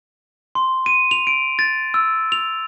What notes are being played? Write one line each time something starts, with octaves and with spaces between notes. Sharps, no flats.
C6
D#7
F7
D7
A6
E6
F7